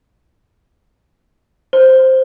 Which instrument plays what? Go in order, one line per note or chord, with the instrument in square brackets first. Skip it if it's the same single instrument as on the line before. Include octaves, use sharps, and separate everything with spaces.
[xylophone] C5